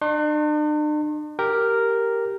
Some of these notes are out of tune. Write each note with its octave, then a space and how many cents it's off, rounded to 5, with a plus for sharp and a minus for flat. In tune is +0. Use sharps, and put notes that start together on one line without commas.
D4 +45 C6 +45
G4 +0 A#4 -5 G5 +0